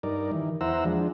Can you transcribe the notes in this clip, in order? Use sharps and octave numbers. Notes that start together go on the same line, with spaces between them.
G2 D#4 A#4 D5
D#3 E3
E2 E4 C5 F#5 A#5 E6
F3 G#3 D4